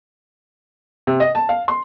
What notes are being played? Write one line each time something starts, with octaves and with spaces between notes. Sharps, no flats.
C3
D#5
A5
F5
C6